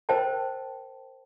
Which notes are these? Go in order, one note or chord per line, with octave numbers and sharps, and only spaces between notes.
A#4 C5 D#5 G5 A5